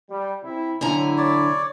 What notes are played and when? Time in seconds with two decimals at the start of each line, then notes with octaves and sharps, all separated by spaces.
0.10 G3
0.43 C3 E4
0.81 A2 D3 F#3 E4 G#5 A#5
1.18 C#5 D5